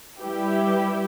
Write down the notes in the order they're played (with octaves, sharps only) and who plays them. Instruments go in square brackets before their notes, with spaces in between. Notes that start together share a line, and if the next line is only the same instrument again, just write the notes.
[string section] G3 E4 G4 B4